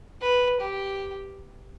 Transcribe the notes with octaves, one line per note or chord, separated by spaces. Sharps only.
B4
G4